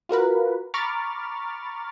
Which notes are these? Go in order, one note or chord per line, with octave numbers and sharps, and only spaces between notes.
F4 F#4 A#4 B4
A#5 B5 C#6 D6 F6 A6